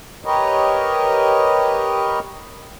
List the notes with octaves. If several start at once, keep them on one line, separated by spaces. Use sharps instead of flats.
G4 A#4 B4 C#5 D#5